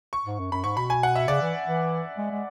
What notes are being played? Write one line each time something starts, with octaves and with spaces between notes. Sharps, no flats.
C#6
G#2
F#2
F#2 B5
G#2 C#6
B2 B5
G#5
F#5
E5
C#3 D5
E3
E3
G#3
G#3